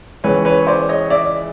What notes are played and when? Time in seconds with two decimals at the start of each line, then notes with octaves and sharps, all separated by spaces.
0.24 C#2 C#3 E3 B4 C#5
0.45 B4 C#5
0.67 C5 D5
0.89 C#5 D#5
1.10 D5 E5